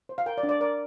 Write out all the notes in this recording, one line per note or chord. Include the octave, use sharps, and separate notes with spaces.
C5
F5
A#4 G5
D5
D4
D5
A#4 D5